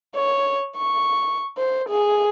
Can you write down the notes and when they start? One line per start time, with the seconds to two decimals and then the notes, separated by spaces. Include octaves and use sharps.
0.16 C#5
0.77 C#6
1.57 C5
1.89 G#4